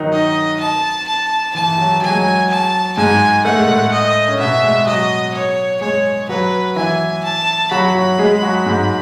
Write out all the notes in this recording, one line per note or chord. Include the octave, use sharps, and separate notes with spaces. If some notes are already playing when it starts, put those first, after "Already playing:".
Already playing: D#3 F#3 D#4 F#4
D#5
A5
A5
E3 A5
E3
F#3
F#3 G#5
G#3
F#3
A5
G#2 G#3 G#5
A3 F#5
G#3
A2 A3
D#5
C#4
B2 B3 E5
G#3 G#4
F#3 F#4 D#5
C#5
G#3 G#4 C#5
F#3 F#4 B4
E3 E4 G#5
A5
F#3 F#4 B5
F#3 F#4
G#3 G#4
F#3 F#4
G#2 G#3